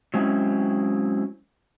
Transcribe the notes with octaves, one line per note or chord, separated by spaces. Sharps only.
F#3 G#3 C4 C#4 E4